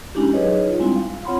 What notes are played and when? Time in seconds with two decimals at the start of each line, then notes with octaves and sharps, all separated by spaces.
0.15 G#3 C#4 D4 E4 F#4 G4
0.33 F#3 D#4 G#4 B4 C#5 D#5
0.68 F4
0.79 G3 G#3 C4 D4 E4
0.96 F5
1.25 C4 F4 C#5 F#5 B5 C6